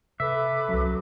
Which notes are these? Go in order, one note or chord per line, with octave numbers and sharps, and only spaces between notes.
C3 A4 B4 E5 D6
C2 F#3 C#4